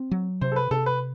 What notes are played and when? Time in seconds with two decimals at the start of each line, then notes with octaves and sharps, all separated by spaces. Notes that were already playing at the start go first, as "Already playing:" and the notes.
Already playing: C4
0.11 F#3
0.41 C3 C5
0.52 A4
0.56 B4
0.71 C3 A4
0.86 B4